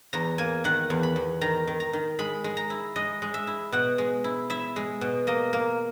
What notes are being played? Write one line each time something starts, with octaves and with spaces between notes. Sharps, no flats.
E2 A#5
A#3 G#5
D#3 F#5
E2
B5
E2
D#3 A#5
D#3
A#5
D#3
G#3 B5
G#3
A#5
E4
G#3 D#5
G#3
E5
E4
B2 F#5
G#3
E4
E4 E5
G#3
B2
A#3 D#5
A#3